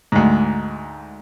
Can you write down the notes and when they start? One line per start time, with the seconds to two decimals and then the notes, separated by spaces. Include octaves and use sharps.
0.12 D2 G#2